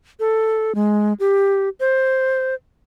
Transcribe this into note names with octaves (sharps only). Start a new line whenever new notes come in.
A4
G#3
G4
C5